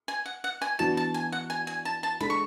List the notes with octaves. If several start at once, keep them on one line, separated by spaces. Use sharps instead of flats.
G#5
F#5
F#5
G#5
E3 B3 D4 F#4 A5
A5
G#5
F#5
G#5
G#5
A5
A5
G#3 D4 A4 B5
C#6